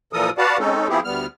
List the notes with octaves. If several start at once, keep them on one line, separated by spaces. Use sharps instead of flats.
A#2 E3 F3 A4 A#4 D#6
F#4 B4 D5 F5 F#5 A5
G#3 C4 C#4 D#4 A4
F3 B3 C4 E4 G4 G#4
D2 G3 B3 F6